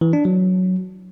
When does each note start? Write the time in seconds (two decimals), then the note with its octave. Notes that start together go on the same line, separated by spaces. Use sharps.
0.01 E3
0.13 D4
0.25 F#3